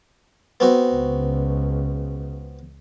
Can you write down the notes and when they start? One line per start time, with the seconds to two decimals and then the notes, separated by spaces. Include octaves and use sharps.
0.60 B3 C4 F#4
0.92 C#2 C#3